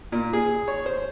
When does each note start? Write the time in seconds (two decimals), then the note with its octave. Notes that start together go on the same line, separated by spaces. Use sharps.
0.12 A#2
0.33 G#4
0.68 C#5
0.86 C5